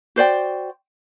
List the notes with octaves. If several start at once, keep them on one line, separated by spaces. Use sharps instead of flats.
F#4 C5 D5 G5